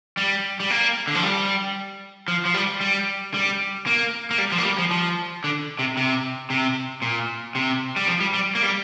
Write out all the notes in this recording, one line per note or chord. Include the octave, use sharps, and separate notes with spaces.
G3
G3
A#3
D3
F3
G3
F3
F3
G3
G3
G3
A#3
A#3
G3
F3
A#3
G3
F3
F3
D3
C3
C3
C3
A#2
C3
G3
F3
G3
G3
A#3
G3